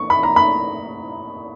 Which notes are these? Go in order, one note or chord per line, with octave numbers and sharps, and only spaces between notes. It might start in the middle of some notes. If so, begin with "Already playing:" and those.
Already playing: C#6
B5
A#5
B5